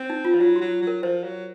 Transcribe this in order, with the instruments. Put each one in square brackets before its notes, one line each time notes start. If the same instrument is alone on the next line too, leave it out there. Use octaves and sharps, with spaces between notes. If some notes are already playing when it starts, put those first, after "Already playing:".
Already playing: [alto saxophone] C4
[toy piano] D#4
F4
[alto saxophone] F3
[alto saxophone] F#3 [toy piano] F4
[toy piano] F#4
[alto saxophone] F#3
F#3
[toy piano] A#4
[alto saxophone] F3 [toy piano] C5
[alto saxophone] F#3